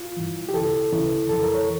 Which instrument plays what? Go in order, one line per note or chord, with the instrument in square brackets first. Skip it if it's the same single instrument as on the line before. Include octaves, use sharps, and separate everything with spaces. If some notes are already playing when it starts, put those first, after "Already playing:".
Already playing: [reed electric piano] F4
G2 E3
G4
D2 C#3 E3 A4
D2 C#3 E3
F2 E3 A4
A#4
C#5